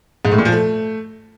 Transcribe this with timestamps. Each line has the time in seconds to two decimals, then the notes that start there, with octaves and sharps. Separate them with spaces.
0.25 G#2
0.31 A2
0.38 A#2
0.45 F3
0.52 A3